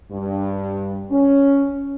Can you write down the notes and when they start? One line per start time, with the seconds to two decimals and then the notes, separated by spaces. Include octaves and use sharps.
0.12 G2
1.11 C#4